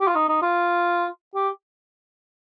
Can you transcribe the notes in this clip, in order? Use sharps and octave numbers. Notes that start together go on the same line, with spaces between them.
G4
F4
D#4
D#4
F4
G4